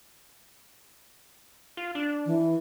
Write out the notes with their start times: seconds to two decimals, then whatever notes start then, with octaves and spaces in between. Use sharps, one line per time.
1.77 F4
1.95 D4
2.26 E3